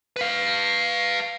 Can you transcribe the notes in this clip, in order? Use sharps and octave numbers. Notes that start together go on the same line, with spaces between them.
B4 F5